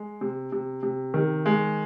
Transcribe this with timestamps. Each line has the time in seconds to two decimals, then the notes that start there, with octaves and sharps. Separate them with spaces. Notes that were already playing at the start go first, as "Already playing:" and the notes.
Already playing: G#3
0.21 C3
0.52 C3
0.83 C3
1.14 D#3
1.46 G#3